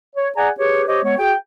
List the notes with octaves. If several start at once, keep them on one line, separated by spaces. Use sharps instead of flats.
C#5
G#4 D5 F#5 G#5 A#5
G4 G#4 B4 C#5
G4 C5 C#5 D#5
G#3 B3 C#5
F#4 G#4 G5